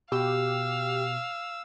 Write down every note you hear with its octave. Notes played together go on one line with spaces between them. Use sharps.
B2 G4 F5 E6